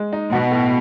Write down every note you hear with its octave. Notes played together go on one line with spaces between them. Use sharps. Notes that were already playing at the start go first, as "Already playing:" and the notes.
Already playing: G#3
D#4
B2 F#4
A2